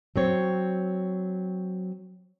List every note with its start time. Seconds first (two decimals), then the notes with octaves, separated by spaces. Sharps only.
0.16 F#3 C4 C#5